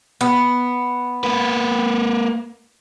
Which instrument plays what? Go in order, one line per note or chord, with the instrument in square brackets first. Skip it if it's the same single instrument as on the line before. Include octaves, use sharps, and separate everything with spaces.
[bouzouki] B3
[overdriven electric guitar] A#3 B4